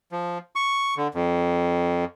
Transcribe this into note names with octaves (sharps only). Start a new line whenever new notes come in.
F3
C#6
D3
F2